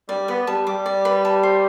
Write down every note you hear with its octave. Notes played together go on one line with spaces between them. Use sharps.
G3 D5
B3 B4
G3 A5
G3 D6
D5
B4
A5
C5